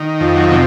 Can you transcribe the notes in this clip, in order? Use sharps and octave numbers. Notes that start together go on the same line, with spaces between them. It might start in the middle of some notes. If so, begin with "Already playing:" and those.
Already playing: D#3
F2
F#3
C3 F#3